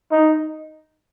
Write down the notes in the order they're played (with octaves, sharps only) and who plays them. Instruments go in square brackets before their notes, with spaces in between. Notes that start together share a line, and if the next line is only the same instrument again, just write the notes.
[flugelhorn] D#4